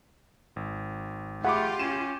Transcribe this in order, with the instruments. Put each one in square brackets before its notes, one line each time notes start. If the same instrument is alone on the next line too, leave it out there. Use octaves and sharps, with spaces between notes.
[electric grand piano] G#1
[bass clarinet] A3 [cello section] F4 G4 [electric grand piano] G#4 B5 D6 [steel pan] F#5
[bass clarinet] C#4 [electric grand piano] D#7 E7